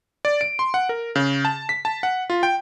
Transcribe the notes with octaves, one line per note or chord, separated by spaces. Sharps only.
D5
D7
C6
F#5
A#4
C#3
A5
B6
A5
F#5
F4
G5